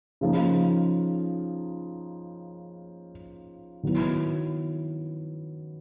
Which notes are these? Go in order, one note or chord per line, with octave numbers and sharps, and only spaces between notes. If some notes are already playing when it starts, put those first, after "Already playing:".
C#3 F3 A#3 D#4
D#3 F#3 B3 E4